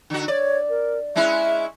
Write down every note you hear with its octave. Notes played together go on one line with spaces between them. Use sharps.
D3 F#4
C#5 D5
A#4
G#3 C#4 E4 E5